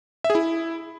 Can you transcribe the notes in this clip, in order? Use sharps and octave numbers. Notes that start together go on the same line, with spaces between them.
E5
G#4
E4